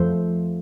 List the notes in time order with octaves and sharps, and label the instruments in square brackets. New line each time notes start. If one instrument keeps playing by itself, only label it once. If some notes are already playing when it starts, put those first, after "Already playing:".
Already playing: [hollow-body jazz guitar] F2 F3 A3 C5